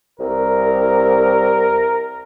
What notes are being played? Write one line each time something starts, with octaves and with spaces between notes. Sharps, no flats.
C2 A#4